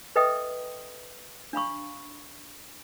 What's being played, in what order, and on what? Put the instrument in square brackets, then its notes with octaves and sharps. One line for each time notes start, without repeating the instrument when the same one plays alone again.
[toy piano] A4 B4 D#5 E5 G5 D#6
D4 F5 B5 C#6